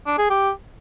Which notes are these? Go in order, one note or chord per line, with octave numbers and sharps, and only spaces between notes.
D4
G#4
G4